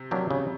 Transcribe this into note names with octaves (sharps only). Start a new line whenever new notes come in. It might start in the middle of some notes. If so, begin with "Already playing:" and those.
Already playing: C3
F#3 A#3 D4 G4
C#3